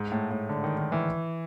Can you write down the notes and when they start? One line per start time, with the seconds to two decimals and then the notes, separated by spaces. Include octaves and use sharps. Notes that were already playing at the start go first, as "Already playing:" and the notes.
Already playing: G#2
0.12 A2
0.30 A2
0.49 D3
0.64 D#3
0.77 D#3
0.92 E3